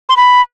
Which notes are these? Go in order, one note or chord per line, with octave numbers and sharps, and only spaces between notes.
C6
B5